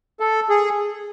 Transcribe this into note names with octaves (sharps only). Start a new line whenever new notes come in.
A4
G#4